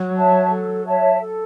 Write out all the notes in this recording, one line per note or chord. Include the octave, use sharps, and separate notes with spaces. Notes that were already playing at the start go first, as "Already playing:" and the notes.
Already playing: F#3
C#5 E5 A5
A4
C#5 E5 A5
A4